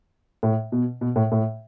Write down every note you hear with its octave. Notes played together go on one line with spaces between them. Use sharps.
A2
B2
B2
A2
A2